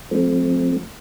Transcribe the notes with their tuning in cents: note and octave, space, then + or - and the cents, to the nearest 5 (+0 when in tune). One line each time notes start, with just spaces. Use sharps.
F3 +25 A3 -25 C4 +0